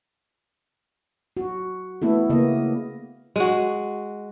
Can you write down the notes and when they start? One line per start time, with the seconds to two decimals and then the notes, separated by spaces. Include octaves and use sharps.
1.37 F#4
2.02 A3 B3 E4 A4
2.30 C#3 A#3 B3 D#5
3.36 G#3 F#4